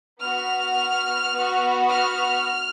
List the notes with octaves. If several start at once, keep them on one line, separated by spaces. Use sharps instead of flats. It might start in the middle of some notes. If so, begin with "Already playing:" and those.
B3 F#4 F6
B3 F#4
F6